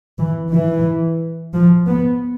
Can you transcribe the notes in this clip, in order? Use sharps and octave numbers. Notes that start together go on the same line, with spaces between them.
E3
E3
F3
B3